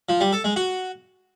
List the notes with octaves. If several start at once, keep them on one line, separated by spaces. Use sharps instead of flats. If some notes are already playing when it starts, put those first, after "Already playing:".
F3
G3
A4
G#3
F#4